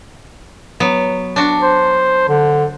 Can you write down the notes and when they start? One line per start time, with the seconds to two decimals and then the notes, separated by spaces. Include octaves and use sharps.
0.80 F#3 B3
1.36 D4 F#4
1.62 C5
2.29 D3